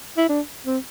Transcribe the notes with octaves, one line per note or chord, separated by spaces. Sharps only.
E4
D4
C4